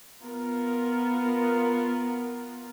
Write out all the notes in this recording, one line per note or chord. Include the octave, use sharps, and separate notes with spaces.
B3 F4 A#4